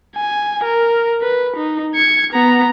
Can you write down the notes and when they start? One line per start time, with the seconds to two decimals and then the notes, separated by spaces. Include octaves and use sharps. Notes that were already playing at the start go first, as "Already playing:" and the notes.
0.16 G#5
0.64 A#4
1.22 B4
1.56 D#4
1.95 G#6 C#7
2.33 B3 A#5